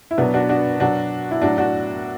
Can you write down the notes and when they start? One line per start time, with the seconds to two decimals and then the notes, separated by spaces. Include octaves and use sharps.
0.11 E4
0.18 B2 F#3 B3 D4
0.34 D4 F#4
0.49 D4 F#4
0.80 B2 F#3 D4 F#4
1.31 E4
1.41 A2 F#3 D4 F#4
1.58 D4 F#4